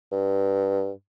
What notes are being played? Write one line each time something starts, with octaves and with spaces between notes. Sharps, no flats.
G2